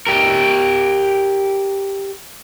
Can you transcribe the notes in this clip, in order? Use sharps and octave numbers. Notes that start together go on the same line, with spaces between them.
G4 A#4